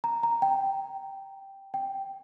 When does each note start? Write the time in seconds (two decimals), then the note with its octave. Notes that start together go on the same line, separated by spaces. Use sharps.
0.04 A#5
0.23 A#5
0.42 G5
1.74 G5